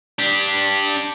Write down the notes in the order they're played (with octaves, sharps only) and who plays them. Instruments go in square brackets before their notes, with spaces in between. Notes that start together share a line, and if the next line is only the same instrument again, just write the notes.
[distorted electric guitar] D4 G4